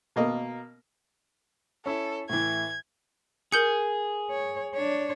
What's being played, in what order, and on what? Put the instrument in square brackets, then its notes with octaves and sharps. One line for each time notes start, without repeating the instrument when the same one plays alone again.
[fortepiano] B2 A#3 D#5
[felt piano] C#4 E4 [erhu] A4
[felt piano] A2 E3 [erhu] G#6
[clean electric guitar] G#4 [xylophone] A#4 G6 C#7
[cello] C#5
D4 C#5